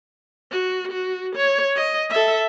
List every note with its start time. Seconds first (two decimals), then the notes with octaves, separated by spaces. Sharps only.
0.51 F#4
0.92 F#4
1.36 C#5
1.76 D#5
2.10 A4 E5